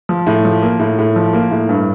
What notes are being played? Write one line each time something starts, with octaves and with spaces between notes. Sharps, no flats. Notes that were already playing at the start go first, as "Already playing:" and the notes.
F3
A2
F3
A#3
A2
A2
F3
A#3
A2
G2